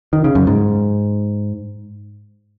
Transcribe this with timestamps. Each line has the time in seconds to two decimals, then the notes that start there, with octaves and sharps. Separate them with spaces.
0.13 D#3
0.24 C#3
0.35 F#2
0.47 G#2